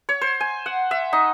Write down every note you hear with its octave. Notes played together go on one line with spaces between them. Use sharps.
C#5
C5
G#5
F#5
E5
D#4